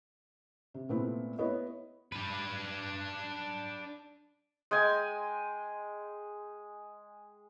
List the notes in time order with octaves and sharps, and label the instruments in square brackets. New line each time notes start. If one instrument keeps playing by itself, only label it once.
[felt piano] C3
A#2 A3 B3 C4 E4
B3 E4 C#5 D#5
[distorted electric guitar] D4 B4
[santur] G#3 G5 G#5